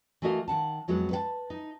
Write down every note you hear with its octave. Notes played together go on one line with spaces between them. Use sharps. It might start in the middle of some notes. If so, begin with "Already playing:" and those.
E3 A3 F#4 A#4 D#5 F5
D#3 F#5 A5
F2 F#3 G#3 B3
B4 F#5 A5
D#4